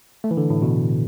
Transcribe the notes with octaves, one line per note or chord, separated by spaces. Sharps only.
A3
E3
D3
A2
B2